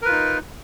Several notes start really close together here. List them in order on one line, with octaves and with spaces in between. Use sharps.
A#4 B4 F4 D#4